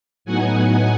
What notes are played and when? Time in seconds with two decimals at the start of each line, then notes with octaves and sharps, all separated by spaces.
0.25 A2 F#3 B3 D#4 F#5 G#5